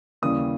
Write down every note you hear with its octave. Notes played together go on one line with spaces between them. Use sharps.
D#2 C#3 E3 G3 D#6